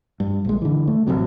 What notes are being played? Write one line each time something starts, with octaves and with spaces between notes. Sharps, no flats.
G2
A#1 G#3
D3 E3
A3
A1 G2 C3 F#3